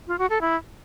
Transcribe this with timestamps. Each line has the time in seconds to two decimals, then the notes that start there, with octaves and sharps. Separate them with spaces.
0.08 F4
0.19 F#4
0.30 A4
0.41 E4